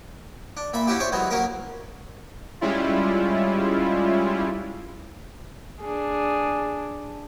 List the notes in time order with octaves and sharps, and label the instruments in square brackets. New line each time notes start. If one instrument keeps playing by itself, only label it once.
[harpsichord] D4
A#2 E5 B5
C#4 E4 F#4 G4
D4 C5 C#5 E5
E3 F#3 G#3 B3
F#3 A#3 C#4 A#4
[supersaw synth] G3 G#3 C#4 E4 F4
[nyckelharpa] D4 G#4